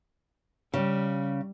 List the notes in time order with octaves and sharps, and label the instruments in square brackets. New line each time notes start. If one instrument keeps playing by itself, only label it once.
[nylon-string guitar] C#3 [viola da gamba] G3